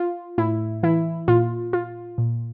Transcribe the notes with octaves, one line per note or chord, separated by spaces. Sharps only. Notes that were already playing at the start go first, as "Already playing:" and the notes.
Already playing: F4
A2 E4
E3 E4
A#2 F4
F4
A#2